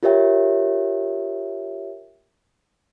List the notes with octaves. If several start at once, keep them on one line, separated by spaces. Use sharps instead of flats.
F4 G4 A#4 C#5 E5 G5